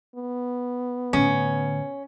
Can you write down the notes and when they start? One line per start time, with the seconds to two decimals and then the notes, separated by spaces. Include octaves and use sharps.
0.16 B3
1.13 A2 D3 C#4